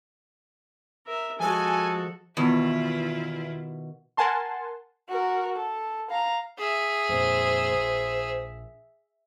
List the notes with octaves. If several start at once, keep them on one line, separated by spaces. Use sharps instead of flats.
A#4 E5
F3 G#3 F#4 A4 G#5
E2 B2 D#3 E4 F4
A#4 F#5 G#5 A5 C6
F#4 A#4
A4
F5 A#5
G#4 E5
F2 A#2 C5
A#1